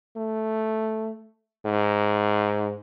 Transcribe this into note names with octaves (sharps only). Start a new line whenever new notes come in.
A3
G#2